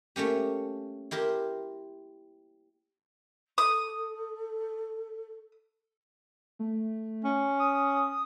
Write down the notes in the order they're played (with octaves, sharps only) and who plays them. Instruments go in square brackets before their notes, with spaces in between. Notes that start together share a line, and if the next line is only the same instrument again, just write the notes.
[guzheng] A3 A#3 C#4 G4
E4 G4 A#4 C5
[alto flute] A4 [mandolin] D#6
[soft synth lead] A3
[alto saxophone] C#4
[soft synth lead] D#6